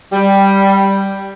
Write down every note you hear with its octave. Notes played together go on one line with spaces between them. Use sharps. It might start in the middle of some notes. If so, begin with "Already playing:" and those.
G3